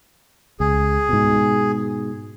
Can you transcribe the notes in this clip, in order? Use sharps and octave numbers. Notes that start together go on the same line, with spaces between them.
C#2 G#4
G#2 B2